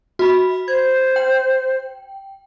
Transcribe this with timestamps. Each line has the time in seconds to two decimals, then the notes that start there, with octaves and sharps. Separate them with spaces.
0.19 F#4 B5
0.68 C5 G#6
1.16 G5